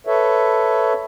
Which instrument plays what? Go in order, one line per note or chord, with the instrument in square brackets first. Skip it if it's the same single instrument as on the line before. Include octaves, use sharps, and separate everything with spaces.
[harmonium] A4 B4 C#5 E5